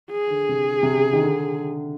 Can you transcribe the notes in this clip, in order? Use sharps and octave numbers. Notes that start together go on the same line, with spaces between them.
G#4
D3
C3
C3
C#3
D#3
D3